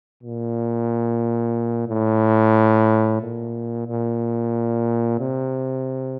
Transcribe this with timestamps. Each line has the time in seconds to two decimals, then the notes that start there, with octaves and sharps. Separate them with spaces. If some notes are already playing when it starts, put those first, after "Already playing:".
0.23 A#2
1.88 A2
3.21 A#2
3.87 A#2
5.20 C3